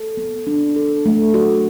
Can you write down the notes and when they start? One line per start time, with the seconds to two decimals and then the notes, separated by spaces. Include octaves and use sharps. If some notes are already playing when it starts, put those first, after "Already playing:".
Already playing: A4
0.17 B3
0.47 D4
0.76 A4
1.06 A3
1.34 F#4